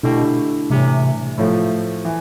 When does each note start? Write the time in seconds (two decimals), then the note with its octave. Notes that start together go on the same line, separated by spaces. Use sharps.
0.03 B2 D3 A3 E4 G4
0.70 A2 C3 E3 G3
1.38 A2 F3 A3
2.05 E3